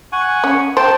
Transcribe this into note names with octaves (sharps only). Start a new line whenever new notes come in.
F#5 G#5 C#6
C#4
C5 G5 A5